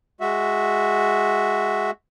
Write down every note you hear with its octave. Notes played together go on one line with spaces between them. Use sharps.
G#3 F#4 E5